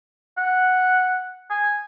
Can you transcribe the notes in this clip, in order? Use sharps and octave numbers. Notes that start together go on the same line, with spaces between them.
F#5
G#5